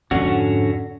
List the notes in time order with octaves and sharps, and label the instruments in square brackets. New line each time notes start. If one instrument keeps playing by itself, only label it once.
[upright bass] F2 G#2 [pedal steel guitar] D3 C#4 F#4